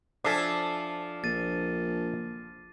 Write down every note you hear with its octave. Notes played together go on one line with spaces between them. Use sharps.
F3 D4 A4 E5 G#5 D6 C7
A#1 A6 D#7